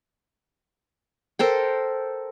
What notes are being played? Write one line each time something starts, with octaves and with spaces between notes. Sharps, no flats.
A4 A#4 C5 G5